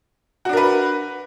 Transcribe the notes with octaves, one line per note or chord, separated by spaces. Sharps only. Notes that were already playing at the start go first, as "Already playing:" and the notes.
D4 F#4 A#4 B4